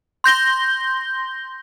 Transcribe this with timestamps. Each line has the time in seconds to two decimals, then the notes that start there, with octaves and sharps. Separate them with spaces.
0.24 C6 G6 A#6 G7